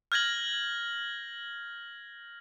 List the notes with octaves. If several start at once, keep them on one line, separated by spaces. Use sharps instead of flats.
F6 G6 G#6 A#6 F#7